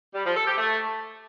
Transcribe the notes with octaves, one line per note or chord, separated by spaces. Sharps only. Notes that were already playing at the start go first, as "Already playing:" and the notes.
G3
F3
A4
G4
A3